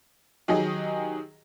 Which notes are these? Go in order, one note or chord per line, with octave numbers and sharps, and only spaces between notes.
D#3 F#3 G4 G#4 D#5